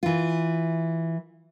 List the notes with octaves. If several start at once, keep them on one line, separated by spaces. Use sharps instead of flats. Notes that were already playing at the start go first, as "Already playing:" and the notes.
E3 F4